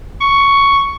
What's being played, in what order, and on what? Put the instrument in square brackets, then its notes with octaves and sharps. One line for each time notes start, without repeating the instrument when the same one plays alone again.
[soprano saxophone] C#6